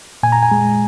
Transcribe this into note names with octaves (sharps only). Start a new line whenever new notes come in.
A#2 G#5
A#5
G#5
G#3